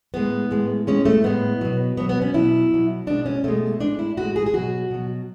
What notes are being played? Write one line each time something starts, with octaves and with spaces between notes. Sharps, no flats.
A2 G#3 B3
A2 G#3
A2 G#3 C#4
A3
A2 G#3 B3
B2 F#3
B2 F#3 B3
B3
C#4
B2 F#3 E4
B2 F#3
B2 G#3 D4
C#4
B2 G#3 A3
A2 G#3 D4
E4
A2 G#3 F#4
G#4
G#4
B2 F#3 F#4
B2 F#3